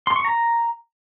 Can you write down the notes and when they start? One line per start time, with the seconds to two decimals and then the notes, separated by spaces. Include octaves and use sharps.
0.07 C6
0.16 C#6
0.25 A#5